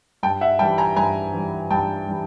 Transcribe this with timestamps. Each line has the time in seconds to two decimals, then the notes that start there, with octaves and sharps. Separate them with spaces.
0.23 G2 G5 A5
0.41 E5 F#5
0.59 E3 G3 G5 A5
0.78 G#5 A#5
0.96 G2 G#5 A#5
1.34 E3 G3
1.70 G2 G5 A5
2.07 E3 G3